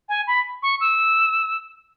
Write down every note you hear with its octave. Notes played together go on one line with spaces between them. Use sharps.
G#5
B5
C#6
E6